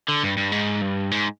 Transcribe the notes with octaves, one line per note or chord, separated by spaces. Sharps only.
D3
G2
G2
G#2
G2
G#2